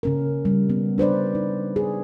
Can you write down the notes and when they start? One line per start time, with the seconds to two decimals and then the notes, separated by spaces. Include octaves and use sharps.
0.03 C#3 C#4 A#4
0.45 G3
0.70 B3
0.98 D4 B4 C5 D5
1.35 D#4
1.76 G#4